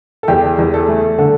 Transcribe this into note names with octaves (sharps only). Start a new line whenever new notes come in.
A4
E2 G4
E2
A4
A3
D3 A4